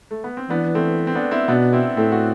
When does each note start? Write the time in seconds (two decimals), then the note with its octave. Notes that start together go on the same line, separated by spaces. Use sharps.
0.11 A3
0.24 B3
0.37 C4
0.49 E3 B3 D4
0.75 A3 C4
1.07 C4
1.15 B3 D4
1.31 C4 E4
1.48 B2 B3 D4
1.73 C4 E4
1.97 A2 A3 C4
2.12 F#4